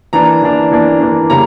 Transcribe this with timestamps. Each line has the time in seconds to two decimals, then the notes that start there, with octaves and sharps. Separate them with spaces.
0.13 E3 A#3 D4 A#5
0.42 E3 A#3 D4
0.71 E3 A#3 D4
1.00 E3 A#3 D4
1.30 C#3 G3 A#3 A#5